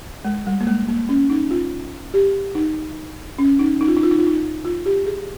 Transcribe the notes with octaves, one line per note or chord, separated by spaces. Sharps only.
G#3
G3
A#3
G#3
A#3
C#4
D#4
F4
G4
D#4
C#4
D#4
D#4
F4
D#4
F4
D#4
F4
D#4
F4
G4
G#4